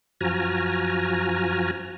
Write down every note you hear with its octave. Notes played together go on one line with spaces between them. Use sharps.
F#2 F3 F#4 G#5 A#5 F6